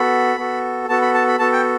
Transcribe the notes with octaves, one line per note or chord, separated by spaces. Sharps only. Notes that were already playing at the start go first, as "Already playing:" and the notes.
Already playing: B3 F#4 A4 B5
B3 F#4 A4
B3 F#4 A4 A5
B5
A5
B5
B3 F#4 A4 A5
G5